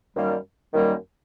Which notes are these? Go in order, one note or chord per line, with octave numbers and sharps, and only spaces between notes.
F#2 D#3 G3 A#3
F#2 D#3 G3 A#3